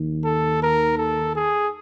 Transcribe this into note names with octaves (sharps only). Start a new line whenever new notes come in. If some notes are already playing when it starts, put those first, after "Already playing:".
Already playing: D#2 D#3
A4
A#4
A4
G#4